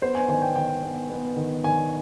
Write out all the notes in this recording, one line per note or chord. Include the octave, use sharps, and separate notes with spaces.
B3 C5
G#5
D#3 G#5
G5
D#3 G5
B3
B3
D#3
D#3 G#5